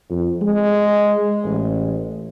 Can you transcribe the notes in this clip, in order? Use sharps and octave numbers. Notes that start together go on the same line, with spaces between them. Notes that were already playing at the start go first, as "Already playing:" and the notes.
F2
G#3
A1